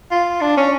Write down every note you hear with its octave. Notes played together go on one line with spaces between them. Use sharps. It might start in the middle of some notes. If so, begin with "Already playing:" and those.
F4
D4
C#4